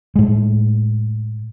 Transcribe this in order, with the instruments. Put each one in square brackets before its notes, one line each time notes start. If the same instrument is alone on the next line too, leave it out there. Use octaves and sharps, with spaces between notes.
[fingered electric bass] A2 G#3